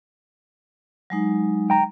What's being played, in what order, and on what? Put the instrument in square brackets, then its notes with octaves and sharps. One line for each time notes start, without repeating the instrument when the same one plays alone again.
[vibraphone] F#3 G#3 D#4
[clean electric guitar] G5 A#5